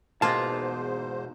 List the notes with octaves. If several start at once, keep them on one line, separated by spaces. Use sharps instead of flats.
E2 G#2 B2 G#3 A#3 F4 C5 A5